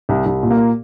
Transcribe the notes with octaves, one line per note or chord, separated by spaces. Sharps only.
C2
C2
A#2
A#3